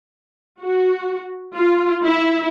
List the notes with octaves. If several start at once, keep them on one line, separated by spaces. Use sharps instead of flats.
F#4
F4
E4